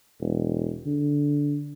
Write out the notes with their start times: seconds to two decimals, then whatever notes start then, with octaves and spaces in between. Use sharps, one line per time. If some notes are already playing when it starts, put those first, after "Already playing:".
0.21 E1
0.86 D3